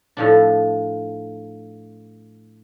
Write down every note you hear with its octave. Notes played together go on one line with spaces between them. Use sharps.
A2 F3 D4